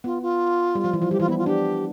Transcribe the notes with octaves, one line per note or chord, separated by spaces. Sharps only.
B3 F4
F4
G3
F3
E3
F3
G3 G4
E3 F4
B3 E4
F4
D4 G4